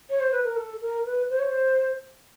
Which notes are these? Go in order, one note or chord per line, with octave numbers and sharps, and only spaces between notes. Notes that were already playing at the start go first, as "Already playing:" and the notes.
C#5
C5
B4
A#4
A4
A#4
B4
C5
C#5
C5